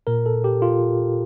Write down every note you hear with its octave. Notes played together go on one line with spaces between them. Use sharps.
A#2 A#4
A4
G4
F4